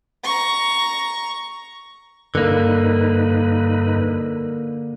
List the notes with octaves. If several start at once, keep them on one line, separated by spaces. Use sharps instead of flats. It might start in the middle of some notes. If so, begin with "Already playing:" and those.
A#5 C#6
G2 D3 A#3 D#4 B4